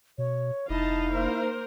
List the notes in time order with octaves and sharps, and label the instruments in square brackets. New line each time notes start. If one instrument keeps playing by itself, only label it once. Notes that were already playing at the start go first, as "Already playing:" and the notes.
[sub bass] B2 [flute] C#5
[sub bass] F1 [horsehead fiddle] D#4 F5 [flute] E4 [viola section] D#5 A5
[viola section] A#3 A#4 C5